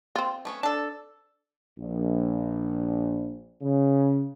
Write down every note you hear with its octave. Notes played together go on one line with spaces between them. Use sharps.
C4 F4
A3 B3 C#4
D4 A4 A5
A#1
C#3